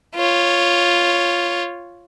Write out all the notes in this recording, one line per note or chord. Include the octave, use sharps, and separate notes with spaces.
F4 C#5